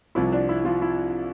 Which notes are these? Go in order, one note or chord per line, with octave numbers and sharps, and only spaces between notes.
C2 C3 F3 E4
D4
E4
F3 F4
E4